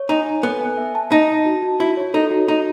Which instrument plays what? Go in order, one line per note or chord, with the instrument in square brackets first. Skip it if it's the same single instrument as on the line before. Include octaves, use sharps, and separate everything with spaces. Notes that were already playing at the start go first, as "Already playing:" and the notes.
Already playing: [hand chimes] C#5
[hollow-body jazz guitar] D#4 [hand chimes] G#5
[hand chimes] G#5
[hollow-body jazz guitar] B3 [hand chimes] A4
[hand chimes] G#5
E5
A5
[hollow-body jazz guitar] D#4 [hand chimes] A5
[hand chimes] A5
F#4
F#4
[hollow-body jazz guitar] E4 [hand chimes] F#4
[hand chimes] C#5
[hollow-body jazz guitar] D#4 [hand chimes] A4
[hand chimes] F#4
[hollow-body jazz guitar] D#4 [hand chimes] F#4